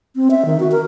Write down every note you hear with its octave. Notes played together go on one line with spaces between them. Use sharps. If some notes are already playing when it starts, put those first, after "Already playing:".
C4
E5
D#3
F#4
A#4